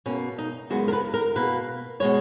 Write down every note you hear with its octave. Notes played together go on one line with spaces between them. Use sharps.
B2 A#3 C#4
D#4
F#2 C#3 G#3 B3 F#4
A#4
B4
A#4
B2 A#3 B4
B2 G#3 B3 C#5